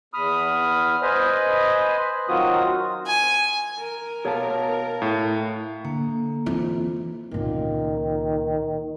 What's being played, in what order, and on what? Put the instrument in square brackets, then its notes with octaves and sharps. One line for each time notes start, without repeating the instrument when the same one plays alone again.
[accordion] E2 B5 D#6 F6
B4 C5 D#5 G#5 B5
D#3 F#3 C4 F4 F#4 D#6
[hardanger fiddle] G#5
[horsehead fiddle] A#4
[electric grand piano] B2 [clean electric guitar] C#5 F5 A5
[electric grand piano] A2
[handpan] D3 [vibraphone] A#3
[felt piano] F2 [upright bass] E3
[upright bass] C#2 A#2 [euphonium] D#3